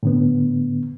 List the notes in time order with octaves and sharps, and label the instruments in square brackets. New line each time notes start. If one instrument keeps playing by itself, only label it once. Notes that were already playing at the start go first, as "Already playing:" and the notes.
[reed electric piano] A2 D3 B3